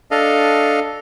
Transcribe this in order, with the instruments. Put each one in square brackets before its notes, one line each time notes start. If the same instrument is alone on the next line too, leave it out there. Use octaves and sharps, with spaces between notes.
[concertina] D4 A4 D#5 F5